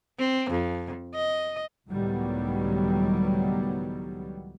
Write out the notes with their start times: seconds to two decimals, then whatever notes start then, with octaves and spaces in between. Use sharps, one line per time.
0.19 C4
0.50 F2
1.14 D#5
1.89 C#2 A2 D#3 F#3 G3 B3